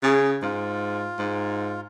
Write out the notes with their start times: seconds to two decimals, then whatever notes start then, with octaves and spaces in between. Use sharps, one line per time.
0.03 C#3 G#4
0.42 G#2 F4
1.19 G#2